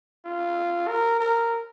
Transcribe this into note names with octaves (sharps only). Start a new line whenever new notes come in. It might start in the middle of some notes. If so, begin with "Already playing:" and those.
F4
A#4
A#4